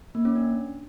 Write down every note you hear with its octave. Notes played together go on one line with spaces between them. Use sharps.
A#3
C#4
D4